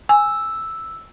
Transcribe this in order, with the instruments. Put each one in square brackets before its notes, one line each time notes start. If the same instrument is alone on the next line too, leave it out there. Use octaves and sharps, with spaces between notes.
[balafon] G#5 [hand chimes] E6